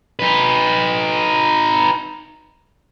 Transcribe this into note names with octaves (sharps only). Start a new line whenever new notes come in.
D#4 B4